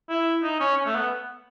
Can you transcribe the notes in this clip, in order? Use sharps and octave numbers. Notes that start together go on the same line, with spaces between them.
E4
D#4
C#4
C#4
A3
B3